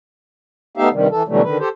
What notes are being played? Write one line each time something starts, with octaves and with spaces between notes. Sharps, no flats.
A3 B3 D#4 G4 E5 F5
G2 C3 D#3 G3
E3 A4
B2 D3 E3 F#3 G3 A3
D3 D#3 B4
G4 A4 C5